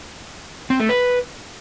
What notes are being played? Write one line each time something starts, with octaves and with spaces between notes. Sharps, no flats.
C4
A3
B4